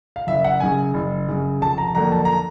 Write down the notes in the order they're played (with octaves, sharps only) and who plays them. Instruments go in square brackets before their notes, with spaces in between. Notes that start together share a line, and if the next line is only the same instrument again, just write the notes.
[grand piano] F5
F#1 E5
F#5
F#2 C#3 G#5
F#1
F#2 C#3
F1 A5
A#5
F2 D3 F#3 A#3 A#5
A5
A#5